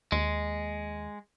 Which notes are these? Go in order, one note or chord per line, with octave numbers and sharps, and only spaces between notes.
D#2 G#3